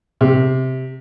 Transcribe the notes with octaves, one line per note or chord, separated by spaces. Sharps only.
C3